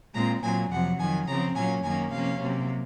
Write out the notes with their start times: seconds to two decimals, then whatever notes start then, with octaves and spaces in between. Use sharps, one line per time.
0.15 A#2 G#3 C4 A#5
0.43 A#2 F#3 C4 G#5
0.71 F2 C3 F#3 F#5
0.99 F2 D#3 F#3 G#5
1.28 C#3 F3 C4 A#5
1.56 A#2 F#3 A#3 C#4 G#5
1.84 F#2 D#3 A#3 C#4 G#5
2.12 C3 F3 A#3 C#4 F5
2.41 C3 F#3 A#3